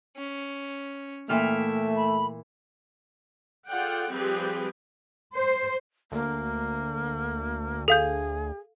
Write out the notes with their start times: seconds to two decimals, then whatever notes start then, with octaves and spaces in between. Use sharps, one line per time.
0.16 C#4
1.29 A#2 E3 A3 E5 G5 F6
1.96 B5
3.68 F4 G#4 A4 D5 F#5 G5
4.11 F3 G3 C4 G4 G#4 B4
5.34 C5
6.12 D2 A#3
7.88 G#4 A4 F5 G6